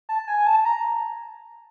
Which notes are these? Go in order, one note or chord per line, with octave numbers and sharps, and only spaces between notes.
A5
G#5
G#5
A5
A#5